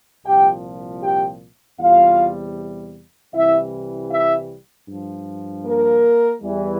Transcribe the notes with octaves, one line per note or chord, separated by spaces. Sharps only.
C2 A#2 F3 G4 G5
G4 G5
E2 C3 G3 F4 F5
C2 C3 E3 G3 E4 E5
E4 E5
G2 F3
A#3 A#4
E2 E3 G3